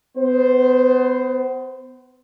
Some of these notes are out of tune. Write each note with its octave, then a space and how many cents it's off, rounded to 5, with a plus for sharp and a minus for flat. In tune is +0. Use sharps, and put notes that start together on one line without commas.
B3 +35 C5 +0